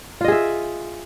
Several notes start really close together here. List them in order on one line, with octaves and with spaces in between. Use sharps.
F4 D#5 G#4 E5